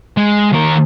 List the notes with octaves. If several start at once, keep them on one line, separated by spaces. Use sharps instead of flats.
G#3
D#2 A#4